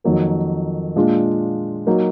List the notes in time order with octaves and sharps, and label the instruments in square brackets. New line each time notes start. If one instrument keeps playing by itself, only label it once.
[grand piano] F2 D#3 F#3 A#3
A#2 G#3 D4 F4
F#3 A#3 D#4